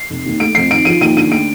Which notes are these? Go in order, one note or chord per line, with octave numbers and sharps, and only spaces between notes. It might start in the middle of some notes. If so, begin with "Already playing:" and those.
Already playing: C7
F1
D#2
A3 D7
F2 C7
D#3 D7
F3 D#7
D#2 D#7
D3 D#7
A3 D7